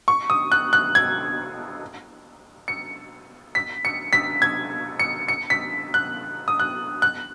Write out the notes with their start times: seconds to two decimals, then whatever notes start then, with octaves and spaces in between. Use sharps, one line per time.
0.08 C#6
0.30 D#6
0.52 F#6
0.73 F#6
0.95 G#6
2.68 C#7
3.55 B6
3.85 C#7
4.13 B6
4.42 G#6
4.99 C#7
5.28 C#7
5.50 B6
5.94 F#6
6.48 D#6
6.60 F#6
7.02 F#6